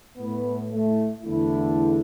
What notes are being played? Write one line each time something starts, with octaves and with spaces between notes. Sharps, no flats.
A2 A3 B3
A3
E2 D3 A3 E4